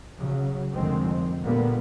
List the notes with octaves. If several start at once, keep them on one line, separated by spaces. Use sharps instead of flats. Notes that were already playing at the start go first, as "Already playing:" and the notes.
C#3 F#3
F1 F2 D3 D#3 G#3 C4
A#2 D3 G3 A#3 B3